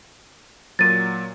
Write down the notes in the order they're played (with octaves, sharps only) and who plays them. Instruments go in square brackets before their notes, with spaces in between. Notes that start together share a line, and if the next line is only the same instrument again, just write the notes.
[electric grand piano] A#2 F#3 [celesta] A6 D#7